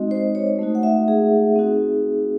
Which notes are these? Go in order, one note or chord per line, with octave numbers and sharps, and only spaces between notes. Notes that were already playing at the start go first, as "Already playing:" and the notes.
Already playing: G#3 C4 D#4 F#4 D#5
C5
C#5
A3 D#4 F#4
F#5
E5
G#4
C4 D#4 F#4